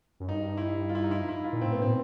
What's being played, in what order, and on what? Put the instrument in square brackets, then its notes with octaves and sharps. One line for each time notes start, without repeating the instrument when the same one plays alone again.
[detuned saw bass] F#2
[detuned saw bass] G2 [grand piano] D#4
[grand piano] E4
D#4
F4
E4
D#4
E4
E4
F4
[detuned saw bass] A#2
[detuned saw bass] A2 [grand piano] C4
[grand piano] B3
[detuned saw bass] A#2 [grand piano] C4